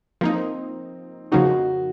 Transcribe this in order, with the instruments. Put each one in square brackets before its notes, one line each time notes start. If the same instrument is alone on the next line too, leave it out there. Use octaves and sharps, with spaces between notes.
[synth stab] F3 A#3 D#4 [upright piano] C4
[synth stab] F2 C#3 F3 A#3 D#4 [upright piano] F#4